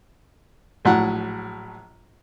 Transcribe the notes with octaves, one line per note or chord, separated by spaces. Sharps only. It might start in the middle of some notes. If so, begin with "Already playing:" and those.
A#1 A2 F#3 F#5